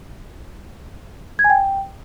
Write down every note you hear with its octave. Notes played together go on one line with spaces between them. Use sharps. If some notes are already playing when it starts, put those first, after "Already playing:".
G#6
G#5
G5